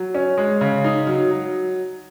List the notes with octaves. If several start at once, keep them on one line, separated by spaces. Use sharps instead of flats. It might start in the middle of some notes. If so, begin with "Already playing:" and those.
Already playing: F#3
C#4
G#3
C#3
D#4
F#3
F#3